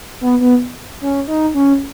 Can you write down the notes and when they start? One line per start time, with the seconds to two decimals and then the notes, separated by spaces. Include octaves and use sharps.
0.21 B3
0.40 B3
1.01 C#4
1.28 D#4
1.54 C#4